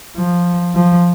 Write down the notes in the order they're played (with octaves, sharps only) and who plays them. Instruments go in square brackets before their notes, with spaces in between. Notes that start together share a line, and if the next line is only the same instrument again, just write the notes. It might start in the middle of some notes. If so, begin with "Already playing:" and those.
[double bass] F3
F3